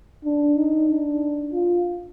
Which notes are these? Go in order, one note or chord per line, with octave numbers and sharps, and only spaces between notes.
D4
D#4
D4
F4